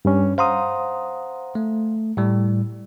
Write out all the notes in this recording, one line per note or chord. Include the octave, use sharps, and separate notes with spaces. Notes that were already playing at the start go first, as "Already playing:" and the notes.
G2 G3 C#4
C5 F5 F#5 A#5 C6 D#6
A3
A2 G3